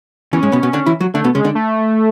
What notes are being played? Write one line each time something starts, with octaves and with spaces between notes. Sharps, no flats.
E2 E3 C#4
G#2 G#3
B2 B3
B2 B3
D3 D4
E3 E4
F#3 F#4
D3 A3 D4
B2 B3
C#3 G#3 C#4
D3 D4
A3